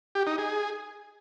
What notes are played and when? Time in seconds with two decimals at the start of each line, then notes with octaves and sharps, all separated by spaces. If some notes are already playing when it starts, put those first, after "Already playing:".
0.15 G4
0.27 D#4
0.38 G#4